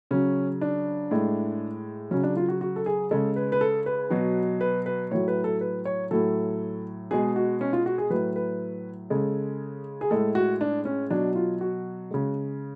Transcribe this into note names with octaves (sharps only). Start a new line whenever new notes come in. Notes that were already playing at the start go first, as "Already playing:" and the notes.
C#3 F#3 C#4
D4
A2 G#3
C#3 F#3 C#4
D4
F4
F#4
F#4
A4
G#4
C#3 G#3 A4
B4
B4
A4
B4
B2 F#3
B4
B4
A2 F#3 C#5
B4
A4
B4
C#5
A2 F#3 A4
B2 G#3 G#4
F#4
C#4
F4
F#4
G#4
A2 F#3 B4
B4
C#3 G#3 A4
G#4
A2 G#3 A4
F#4
D4
C#4
B2 F#3 D4
F4
F#4
C#3 G#3